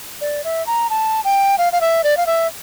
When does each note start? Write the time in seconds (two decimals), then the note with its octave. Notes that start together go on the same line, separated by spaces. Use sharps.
0.21 D5
0.44 E5
0.67 A#5
0.90 A5
1.25 G5
1.58 F5
1.73 F5
1.81 E5
2.04 D5
2.17 F5
2.27 E5